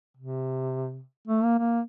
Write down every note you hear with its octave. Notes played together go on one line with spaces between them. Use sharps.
C3
A3
A#3
A#3